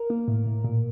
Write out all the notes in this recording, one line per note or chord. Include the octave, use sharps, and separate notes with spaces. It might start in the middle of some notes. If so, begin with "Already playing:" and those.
Already playing: A#4
A#3
A2
A2
A#2